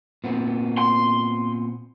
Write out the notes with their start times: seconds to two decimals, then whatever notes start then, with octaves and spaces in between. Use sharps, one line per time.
0.24 A#2 B3 C4
0.78 C6